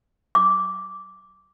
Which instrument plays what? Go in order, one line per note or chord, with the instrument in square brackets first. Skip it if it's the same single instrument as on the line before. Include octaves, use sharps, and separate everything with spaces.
[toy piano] D6